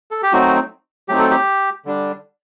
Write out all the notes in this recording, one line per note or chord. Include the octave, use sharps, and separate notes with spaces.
A4
G4
F#3 A3 C4 D#4 F#4
F#3 A3 C4 D#4 G4
A4
G4
D3 G3 D4